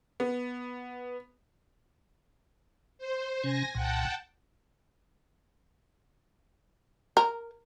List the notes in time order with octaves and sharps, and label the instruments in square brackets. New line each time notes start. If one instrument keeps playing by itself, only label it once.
[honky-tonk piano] B3
[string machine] C5
[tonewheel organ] C3 C#4 [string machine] G#5 A#6
[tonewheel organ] C2 A#2 [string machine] F#5 G5 A5
[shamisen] A#4